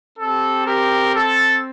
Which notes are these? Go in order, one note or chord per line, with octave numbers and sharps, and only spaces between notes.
C4 G4 A4
G4 A#4
A4